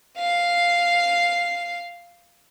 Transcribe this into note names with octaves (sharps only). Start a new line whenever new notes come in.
F5 C7